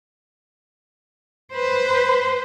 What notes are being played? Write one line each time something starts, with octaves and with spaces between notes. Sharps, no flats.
B4 C5